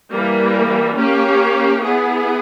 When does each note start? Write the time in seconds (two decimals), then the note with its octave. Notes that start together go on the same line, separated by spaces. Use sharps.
0.12 E3 G3 A#3
0.97 A#3 C#4 G4 C#5
1.82 B3 E4 G#4